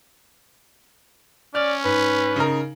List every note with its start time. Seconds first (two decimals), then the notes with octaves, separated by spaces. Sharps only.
1.55 C#4 D5 F6
1.85 G#2 B4
2.36 C#3 D#4 A#4